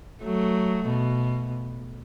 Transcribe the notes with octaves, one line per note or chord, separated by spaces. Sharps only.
F#3 A3
B2